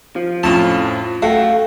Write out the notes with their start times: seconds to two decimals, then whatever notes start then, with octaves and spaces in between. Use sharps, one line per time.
0.16 F3
0.43 F2 A2 C#4 F4 A5
1.22 A3 F#4 F5 G5